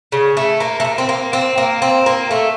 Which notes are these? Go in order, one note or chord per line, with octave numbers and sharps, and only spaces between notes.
C#3
A3
A#3
A3
A#3
C4
A#3
C4
A#3
C4
A#3
A3